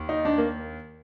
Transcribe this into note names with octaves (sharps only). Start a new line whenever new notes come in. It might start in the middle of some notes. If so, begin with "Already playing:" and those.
Already playing: D#2
D#4
D4
A#3